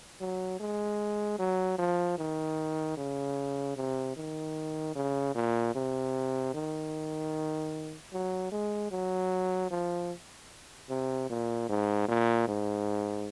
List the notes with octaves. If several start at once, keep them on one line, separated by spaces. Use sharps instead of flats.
F#3
G#3
F#3
F3
D#3
C#3
C3
D#3
C#3
A#2
C3
D#3
F#3
G#3
F#3
F3
C3
A#2
G#2
A#2
G#2